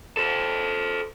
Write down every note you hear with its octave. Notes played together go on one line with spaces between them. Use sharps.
A4 C5